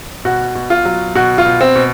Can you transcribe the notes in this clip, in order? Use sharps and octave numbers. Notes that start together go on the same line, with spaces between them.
B2 F#4
B2
F4
F#3
B2 F#4
F4
B2
C4
B2